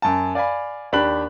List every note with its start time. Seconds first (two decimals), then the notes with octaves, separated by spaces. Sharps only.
0.02 F#2 A5
0.35 D5 F5 G#5 B5
0.92 D#2 D4 G4 B5 F#6 F#7